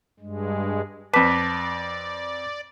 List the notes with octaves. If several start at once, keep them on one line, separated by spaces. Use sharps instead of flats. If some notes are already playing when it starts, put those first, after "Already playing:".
G2 G#3
F2 B4 D5 A5 D6 B6